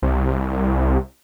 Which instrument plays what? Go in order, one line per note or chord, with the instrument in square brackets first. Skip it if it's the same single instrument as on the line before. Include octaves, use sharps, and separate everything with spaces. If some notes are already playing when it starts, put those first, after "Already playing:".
[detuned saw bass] C2